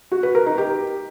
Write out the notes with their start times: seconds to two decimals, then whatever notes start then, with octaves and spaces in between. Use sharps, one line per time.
0.12 F#4
0.23 B4
0.35 A#4
0.46 D#4
0.58 G4